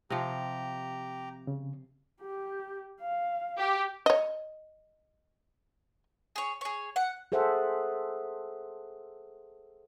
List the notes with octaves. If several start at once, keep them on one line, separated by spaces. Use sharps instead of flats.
C3 F3 G4 A#5
C#3
G4
F5
G4
C#5 D#5
G#4 C#5
G#4 C#5
F#5
G#4 A4 C5 E5 F#5